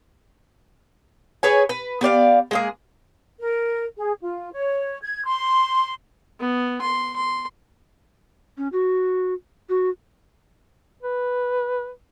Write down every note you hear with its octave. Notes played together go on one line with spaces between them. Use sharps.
G#4 B4 C#5 G#5
B4
B3 G4 D5 F5
G#3 A#3 G#4
A#4
G#4
F4
C#5
G#6
C6
B3
C6
C6
C#4
F#4
F#4
B4